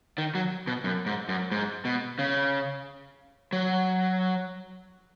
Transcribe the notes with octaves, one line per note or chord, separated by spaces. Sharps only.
D#3
F#3
B2
F#2
G#2
F#2
G#2
B2
C#3
F#3